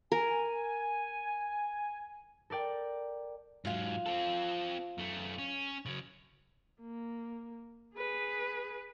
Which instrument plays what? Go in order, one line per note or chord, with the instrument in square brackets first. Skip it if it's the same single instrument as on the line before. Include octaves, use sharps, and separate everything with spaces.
[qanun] A#4 [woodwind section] G#5
[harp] A4 A#4 D5 G5
[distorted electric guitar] G#2 F#3 [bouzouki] F4 F5
[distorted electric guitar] C4 A4
F#2 A3
C#4
C#3 F#3
[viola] A#3
G#4 B4